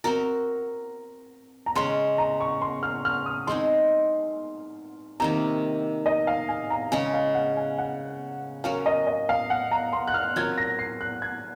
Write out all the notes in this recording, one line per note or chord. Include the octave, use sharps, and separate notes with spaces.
C4 F#4 A#4 A#5
A#5
C#3 G#3 C#4 C6
A#5
C#6
C6
F6
F6
D#6
G#3 C4 D#4 G#4 C6
C3 D#3 A#3 A#5
D#5
F5
G#5
A#5
C#3 G#3 C#4 G#5
F5
F#5
G#5
F#5
F#3 C#4 F#4 A#4 F5
D#5
D#5
F5
F#5
A#5
C6
F#6
F6
F#3 C4 F4 A#4 G#6
A#6
C7
F#6
G#6